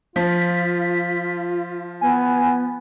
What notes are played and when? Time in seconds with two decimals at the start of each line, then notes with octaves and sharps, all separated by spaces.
0.16 F3 F4 B6
2.01 B3 G#5